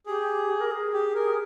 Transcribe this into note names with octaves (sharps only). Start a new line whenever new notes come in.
G4 G#4
A#4
G#4
G4
A#4